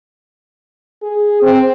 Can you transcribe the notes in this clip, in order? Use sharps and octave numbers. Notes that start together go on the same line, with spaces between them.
G#4
C4